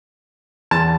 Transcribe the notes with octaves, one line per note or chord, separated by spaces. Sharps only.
E2 A5